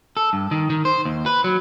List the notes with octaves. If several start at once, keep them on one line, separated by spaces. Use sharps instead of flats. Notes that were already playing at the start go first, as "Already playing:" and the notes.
A4
G2
D#3
D#3
C5
D#2
B4
F#3